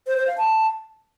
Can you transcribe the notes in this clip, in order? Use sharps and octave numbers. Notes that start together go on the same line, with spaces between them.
C5
C5
F5
A5